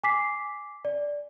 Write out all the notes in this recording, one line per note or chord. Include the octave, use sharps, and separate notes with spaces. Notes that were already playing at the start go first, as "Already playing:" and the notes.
G#5 D6 B6 C7
D5